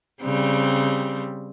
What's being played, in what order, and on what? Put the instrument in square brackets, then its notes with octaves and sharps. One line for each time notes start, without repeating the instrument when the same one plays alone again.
[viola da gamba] C#3 G3 C4